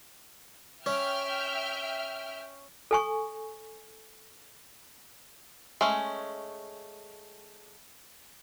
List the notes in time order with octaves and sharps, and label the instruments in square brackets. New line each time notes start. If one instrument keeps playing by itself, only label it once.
[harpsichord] C#4 [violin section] E5 G5 F6
[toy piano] A4 G#5 C#6
[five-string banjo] G#3 A3 C#4